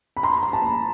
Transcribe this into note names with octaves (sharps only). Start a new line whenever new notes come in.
B5
A#5 C6
A#5
A5 B5